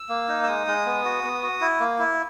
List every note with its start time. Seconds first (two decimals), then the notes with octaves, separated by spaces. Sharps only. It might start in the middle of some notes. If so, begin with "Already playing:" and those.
Already playing: E6
0.09 A#3
0.28 D#4
0.43 E6
0.47 G#3 D#6
0.67 G#3
0.85 B3
1.05 F#4
1.24 B3
1.43 F#4
1.61 E4
1.80 A#3
1.99 E4